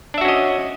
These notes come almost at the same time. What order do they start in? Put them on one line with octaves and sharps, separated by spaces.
D4 E5 F#4 C#4 D#5